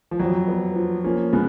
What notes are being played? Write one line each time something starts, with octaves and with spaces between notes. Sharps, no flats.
F3
F2 F#3
B3
F3
F3 A#3 C#4
C#3 G#3 B3